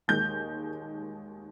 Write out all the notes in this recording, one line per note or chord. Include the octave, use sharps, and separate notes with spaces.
D#2 D#3 G#3 G6